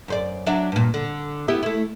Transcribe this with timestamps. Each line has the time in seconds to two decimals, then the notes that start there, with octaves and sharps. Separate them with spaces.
0.08 F#2 C5 D5
0.46 F#3 D4 E5
0.72 G2 A#2
0.94 D3
1.48 B3 E4 G4
1.63 A3 E4